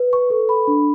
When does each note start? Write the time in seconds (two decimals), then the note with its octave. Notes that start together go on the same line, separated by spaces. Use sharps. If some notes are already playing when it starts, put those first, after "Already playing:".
Already playing: B4
0.13 C#6
0.30 A4
0.49 B5
0.67 D4